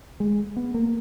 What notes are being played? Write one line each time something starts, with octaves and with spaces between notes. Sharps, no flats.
G#3
B3
A#3